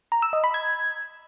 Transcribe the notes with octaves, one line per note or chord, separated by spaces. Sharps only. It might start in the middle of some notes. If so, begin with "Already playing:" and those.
A#5
E6
D#5
B5
G#6